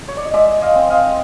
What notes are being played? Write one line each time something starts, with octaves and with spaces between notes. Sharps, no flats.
C#5
D5
D#5
G#3 D5 E5
D#5 F5
C4
D#5 F5